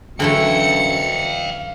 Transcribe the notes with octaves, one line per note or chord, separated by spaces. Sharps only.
F#2 D3 E3 A3 F5 G5 C#7